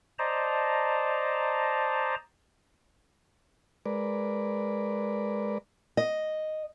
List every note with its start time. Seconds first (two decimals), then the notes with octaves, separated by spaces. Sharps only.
0.19 C5 D5 D#5 A5 A#5
3.86 G#3 A#4 B4 D5
5.97 D#5